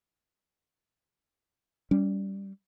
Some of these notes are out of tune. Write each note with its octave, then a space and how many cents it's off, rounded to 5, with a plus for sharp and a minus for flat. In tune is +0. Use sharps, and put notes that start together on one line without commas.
G3 +0 C#4 +35